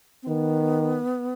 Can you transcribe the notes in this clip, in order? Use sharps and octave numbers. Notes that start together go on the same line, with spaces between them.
C4
D#3 B3